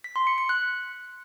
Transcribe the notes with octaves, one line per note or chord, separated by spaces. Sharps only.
B6
C6
C#7
C#7
F#6